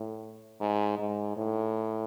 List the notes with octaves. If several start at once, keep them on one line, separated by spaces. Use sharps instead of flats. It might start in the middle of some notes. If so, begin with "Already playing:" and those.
Already playing: A2
G#2
G#2
A2